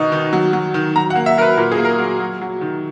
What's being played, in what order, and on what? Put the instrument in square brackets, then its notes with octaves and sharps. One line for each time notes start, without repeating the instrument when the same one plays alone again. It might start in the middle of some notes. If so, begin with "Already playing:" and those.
Already playing: [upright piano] B2 D#3 D#4
D#3
F#3
F#3
D#3
F#3 A#5
F#5
A#3
E5
F#3 A#4
B4
A#2 A#4
G#4
A#3
A#4
F#3
F#3
F#3
D#3